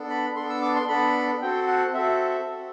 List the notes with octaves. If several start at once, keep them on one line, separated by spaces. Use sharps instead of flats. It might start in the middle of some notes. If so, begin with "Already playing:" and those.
Already playing: B3 D4 A4
B5
B3 D4 A4 C6
E6
D6
C6
B3 D4 A4 B5
C4 F#4 A4 G5
F#5
C4 F#4 A4 E5
C4 F#4 A4